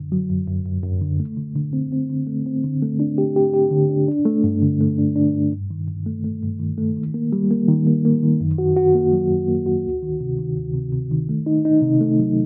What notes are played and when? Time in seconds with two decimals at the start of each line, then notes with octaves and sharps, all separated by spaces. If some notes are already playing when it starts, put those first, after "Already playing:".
Already playing: F#2 D3
0.12 F#3
0.30 F#2
0.47 F#2
0.66 F#2
0.83 F#2
1.02 D3
1.20 A3
1.37 D3
1.55 D3
1.73 C4
1.92 C4
2.10 D3
2.27 A3
2.46 C4
2.64 D3
2.82 A3
3.00 D4
3.18 G4
3.36 G4
3.53 G4
3.71 D3
3.89 D4
4.08 D4
4.25 A3
4.44 G2
4.62 D3
4.80 A3
4.98 D4
5.16 D4
5.35 G2
5.52 G2
5.70 D#3
5.88 G2
6.06 A3
6.24 A3
6.43 G2
6.60 D#3
6.78 A3
6.96 D#3
7.14 A#3
7.32 G3
7.51 A#3
7.68 D#3
7.87 A#3
8.05 A#3
8.23 D#3
8.40 F#2
8.58 F#4
8.77 F#4
8.95 A#3
9.12 F#3
9.30 F#2
9.48 A#3
9.66 F#4
9.85 D2
10.03 D#3
10.20 C3
10.38 D#3
10.57 D2
10.74 C3
10.93 C3
11.11 D#3
11.29 A3
11.46 D#4
11.65 D#4
11.82 C3
12.01 A3
12.19 F#3